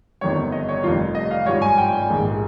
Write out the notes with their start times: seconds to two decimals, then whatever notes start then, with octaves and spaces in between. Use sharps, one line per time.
0.21 G1 F2 D#3 G3 C#5
0.52 D#5
0.69 C#5
0.84 F1 F2 D#3 G3 F4
1.15 D#5
1.31 F5
1.46 G#1 G2 F3 C#5
1.62 G#5
1.78 G5
2.10 A#1 G#2 D#3